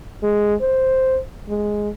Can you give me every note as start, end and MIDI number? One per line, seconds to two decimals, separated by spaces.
0.23 0.55 56
0.61 1.19 72
1.48 1.89 56